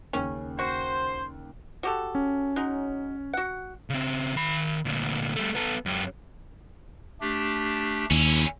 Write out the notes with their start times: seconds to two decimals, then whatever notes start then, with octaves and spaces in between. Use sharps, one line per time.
0.13 D#2 C#3 C#4
0.59 F#4 C5 C6
1.83 F#4 G4 A4
2.15 C#4
2.56 F#3 G#3 D#4
3.33 F#4 F#5
3.90 C#3 C4
4.36 D#3 B5
4.85 D2 A#2
5.36 G3 A3
5.55 B3 A4
5.86 F#2 G4
7.21 A3 D4 G4
8.11 D#2 C#4 E4